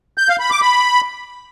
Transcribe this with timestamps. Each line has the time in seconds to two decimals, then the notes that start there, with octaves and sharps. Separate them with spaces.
0.18 G6
0.29 F5
0.40 B5
0.51 D6
0.62 B5